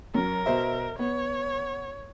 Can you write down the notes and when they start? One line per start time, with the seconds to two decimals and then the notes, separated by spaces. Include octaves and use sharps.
0.14 F#2 A#4
0.46 B2 C5 E5
0.99 B3 C#5